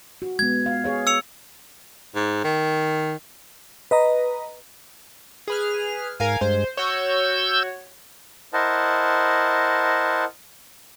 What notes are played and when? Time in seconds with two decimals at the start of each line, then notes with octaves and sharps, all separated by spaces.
0.22 F#4
0.39 G#3 B3 G#6
0.66 F5
0.84 G#4 C#5 F5
1.07 E6 C#7 F7
2.15 G#2
2.44 D#3
3.91 B4 D#5 A#5
5.48 G#4 B4 F6
6.20 G#2 A#4 F5 G#5
6.41 G2 G#3 C5
6.77 F#4 C#5 E6 G6
8.53 E4 A#4 C5 D#5 F#5 A5